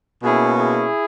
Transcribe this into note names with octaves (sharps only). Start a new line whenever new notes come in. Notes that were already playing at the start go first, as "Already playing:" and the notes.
B2 A#3 C#4 E4 G#4
E4 G#4